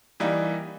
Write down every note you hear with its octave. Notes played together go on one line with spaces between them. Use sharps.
E3 G3 A#3 D#4